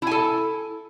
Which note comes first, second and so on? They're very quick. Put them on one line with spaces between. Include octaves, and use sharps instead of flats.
E4 G#5 A4